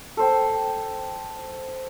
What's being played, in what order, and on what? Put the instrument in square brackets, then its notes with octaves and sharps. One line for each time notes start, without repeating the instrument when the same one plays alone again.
[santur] A4 C5 G5